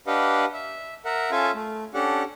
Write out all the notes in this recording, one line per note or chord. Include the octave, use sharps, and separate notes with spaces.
D4 G4 B4 D#5 F5 F#5
E5
A#4 E5 F#5
C#4 F4 A4 E5 F5 G#5
A3
C#4 D4 G4 A4 F#5